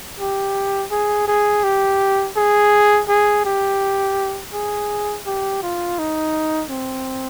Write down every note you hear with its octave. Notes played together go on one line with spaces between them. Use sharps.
G4
G#4
G#4
G4
G#4
G#4
G4
G#4
G4
F4
D#4
C4